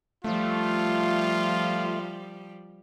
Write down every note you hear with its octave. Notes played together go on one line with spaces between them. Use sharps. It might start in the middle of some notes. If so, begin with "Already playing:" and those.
F3 G3 A3 F4